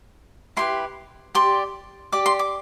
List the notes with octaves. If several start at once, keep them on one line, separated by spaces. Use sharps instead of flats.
E4 G4 B4 C6
G4 D5 C6
G4 D5 D6
C6
D6